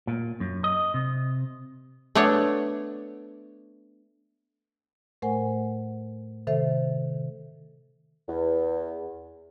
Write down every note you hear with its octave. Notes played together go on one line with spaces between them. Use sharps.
A#2
F#2
D#5
C3
A3 B3 D4 C#5 F#5
A2 A3 A#4 C5 F#5 G#5
C3 D#3 A4 C5 E5
E2